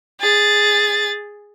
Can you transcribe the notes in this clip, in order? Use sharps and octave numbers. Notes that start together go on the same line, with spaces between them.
G#4 A6